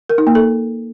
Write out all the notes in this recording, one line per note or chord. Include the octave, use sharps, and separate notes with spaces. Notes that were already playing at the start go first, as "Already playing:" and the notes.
A#4
D#4
A#3
A4